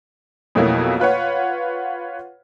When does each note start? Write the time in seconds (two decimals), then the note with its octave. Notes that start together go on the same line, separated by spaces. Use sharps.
0.55 F2 B2 F#3 A3 A#3 E4
1.00 F4 B4 C#5 F#5